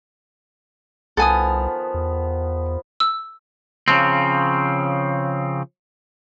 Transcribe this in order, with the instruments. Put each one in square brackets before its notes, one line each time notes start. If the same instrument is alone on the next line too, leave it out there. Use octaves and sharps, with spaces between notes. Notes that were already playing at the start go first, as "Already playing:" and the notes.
[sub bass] C2 [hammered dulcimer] D#3 F3 B3 [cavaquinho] A4 G#5 D#6
[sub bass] E2
[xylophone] E6
[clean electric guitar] C#3 F3 C4